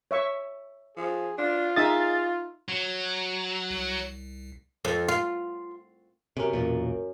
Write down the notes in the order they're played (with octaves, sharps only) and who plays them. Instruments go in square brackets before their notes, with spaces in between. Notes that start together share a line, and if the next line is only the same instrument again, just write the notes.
[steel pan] C#5 E5 C#6
[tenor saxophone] F3 [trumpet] G#4
[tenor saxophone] D4 [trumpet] F4
[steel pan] D#4 E5 D#6 [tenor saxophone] G#4 [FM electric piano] A6
[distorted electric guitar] F#3
[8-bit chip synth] C2
[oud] F2
F4
[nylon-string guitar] F#2 C#4 A#4 [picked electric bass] C3
[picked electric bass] B1 E2 A#2